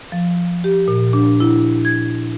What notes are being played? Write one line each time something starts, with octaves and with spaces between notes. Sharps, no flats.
F3
G4
A#2
D4
E4
G#6